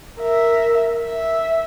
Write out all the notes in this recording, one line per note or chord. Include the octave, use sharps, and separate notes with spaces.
A#4 E5
E5